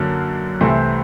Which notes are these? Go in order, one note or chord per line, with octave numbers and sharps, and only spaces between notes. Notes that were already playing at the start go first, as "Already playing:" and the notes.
Already playing: F#2 D3 F#3 A#3 D4
C2 C3 E3 A3 C4